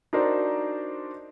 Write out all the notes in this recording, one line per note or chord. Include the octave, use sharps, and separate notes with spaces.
D4 D#4 F#4 A#4 C5 D5